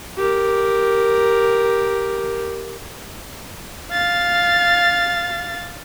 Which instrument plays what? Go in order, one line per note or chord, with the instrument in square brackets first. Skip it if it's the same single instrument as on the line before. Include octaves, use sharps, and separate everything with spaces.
[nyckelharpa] G4 A#4
[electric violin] F5 A6